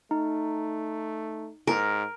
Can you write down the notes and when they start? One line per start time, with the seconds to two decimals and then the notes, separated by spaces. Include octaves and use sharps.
0.11 A3 D#4
1.67 G#2 A#4